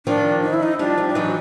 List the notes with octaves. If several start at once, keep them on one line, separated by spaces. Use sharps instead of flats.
D#3 F3 D4
D#4
E4
D#4
F3 G3 D4
F3 G3
D4
E3 F#3 D#4